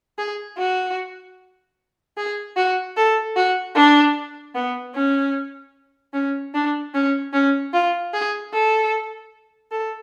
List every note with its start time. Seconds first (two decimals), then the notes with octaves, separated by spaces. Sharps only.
0.18 G#4
0.58 F#4
2.17 G#4
2.57 F#4
2.97 A4
3.36 F#4
3.75 D4
4.55 B3
4.95 C#4
6.13 C#4
6.54 D4
6.94 C#4
7.33 C#4
7.73 F4
8.13 G#4
8.53 A4
9.71 A4